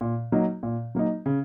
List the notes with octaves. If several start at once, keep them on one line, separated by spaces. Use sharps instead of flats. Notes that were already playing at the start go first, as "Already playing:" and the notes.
A#2
F#3 A#3 D#4
A#2
F#3 A#3 D#4
C#3